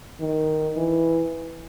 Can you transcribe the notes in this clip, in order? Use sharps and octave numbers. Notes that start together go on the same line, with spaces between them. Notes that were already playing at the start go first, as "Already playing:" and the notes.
D#3
E3